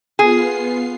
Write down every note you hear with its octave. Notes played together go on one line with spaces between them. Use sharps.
B3 F4 G#4 C7